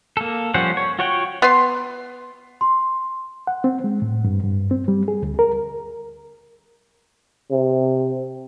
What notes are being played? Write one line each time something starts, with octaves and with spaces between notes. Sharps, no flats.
A#3 A4
F3 G3 C#4 C5 F#5
C#5
F4 F#4 C#5 F#5 G5
B3 C6
C6
F#5
C4
G#3
A2
G2
G2
C4
G3
G#4
D2
A#4
C3